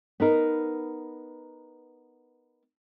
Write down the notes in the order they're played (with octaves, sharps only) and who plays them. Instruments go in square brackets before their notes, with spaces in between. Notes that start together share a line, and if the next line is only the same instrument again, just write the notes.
[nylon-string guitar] B3 D#4 A#4